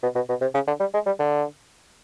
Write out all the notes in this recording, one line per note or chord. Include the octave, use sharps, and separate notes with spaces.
B2
B2
B2
C3
C#3
D3
G3
G#3
G3
D3